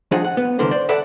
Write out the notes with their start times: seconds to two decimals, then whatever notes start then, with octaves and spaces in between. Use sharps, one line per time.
0.11 F3 D4 D#4 G#4 D#5 F#5
0.25 F#5
0.37 B3
0.59 C2 D3 E3 A#4 C5
0.71 C5 D5
0.89 A4 B4 D5 E5 F#5